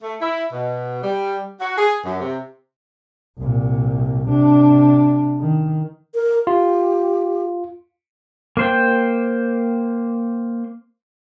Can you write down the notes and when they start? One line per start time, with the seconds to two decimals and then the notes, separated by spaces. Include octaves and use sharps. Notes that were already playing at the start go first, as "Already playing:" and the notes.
0.03 A3
0.20 E4
0.52 B2
1.03 G3
1.60 F#4
1.78 G#4
2.04 F#2
2.21 C3
3.38 C2 A#2
4.29 C3 D4
5.40 D#3
6.15 A#4
6.47 F4 G4
8.57 A#3 C5 G5